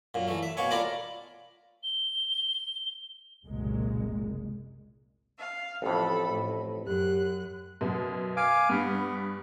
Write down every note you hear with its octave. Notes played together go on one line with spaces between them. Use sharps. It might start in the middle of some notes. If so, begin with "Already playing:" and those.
F#2 A#2
E3 A3
E5
B2 A#3 C#5 G#5
F4 A4 A#4 D5 B5
G7
F#1 C2 A#2 G#3
F5
A1 F2 A4 B5
A2
F#2 G4 F#6
F#2 B2
F5 G#5 D6
G2 B3